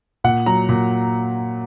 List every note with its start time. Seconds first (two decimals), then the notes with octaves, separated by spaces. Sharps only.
0.24 A#2 F#5
0.46 F#3 A#5
0.69 A#2